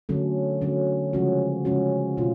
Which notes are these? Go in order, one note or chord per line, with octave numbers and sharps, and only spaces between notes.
D3 F#3 A3 C#4
D3 F#3 A3 C#4
C#3 F3 G#3 C#4 F#4
C#3 F3 G#3 C#4 F#4
B2 A3 D4 F4